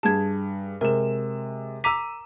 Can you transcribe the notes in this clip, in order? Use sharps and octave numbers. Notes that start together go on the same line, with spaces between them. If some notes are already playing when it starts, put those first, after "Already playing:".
G2 G#4 A5 G#6
C3 G#3 A#4 E7
A#5 D6 E6 B6 D#7